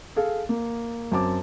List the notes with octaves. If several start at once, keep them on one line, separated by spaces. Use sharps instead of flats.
G#4 A4 F5
A#3
F#2 C4 A5 D6